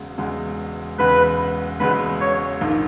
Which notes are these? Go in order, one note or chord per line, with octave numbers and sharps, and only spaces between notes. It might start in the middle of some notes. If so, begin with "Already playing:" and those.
Already playing: E1 E2 C#3 G#3
E1 E2 C#3 G#3
E1 E2 C#3 G#3 B4
E1 E2 C#3 G#3 B4
C#5
A#1 G#2 D#3 A#3